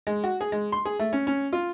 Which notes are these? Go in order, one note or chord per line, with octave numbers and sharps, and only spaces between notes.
G#3
F#4
G#4
G#3
C6
G#4
A3
C#4
C#4
F4